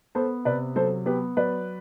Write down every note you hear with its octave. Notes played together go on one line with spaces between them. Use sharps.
B3 A4 C5
C3 B4 D5
F#3 A4 C5
B3 G4 B4
F#3 B4 D5